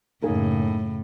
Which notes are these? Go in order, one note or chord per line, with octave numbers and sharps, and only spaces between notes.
F#2 A2 C#3 A#3 D#4 G#4